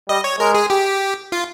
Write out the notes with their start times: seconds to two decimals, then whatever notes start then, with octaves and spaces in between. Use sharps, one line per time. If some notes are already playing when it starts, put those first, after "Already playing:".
0.09 G3 D#5
0.24 C#5
0.40 G#3 A#4
0.54 G#4
0.70 G4
1.32 F4